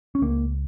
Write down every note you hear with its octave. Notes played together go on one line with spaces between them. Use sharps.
C#4
C#2 A#3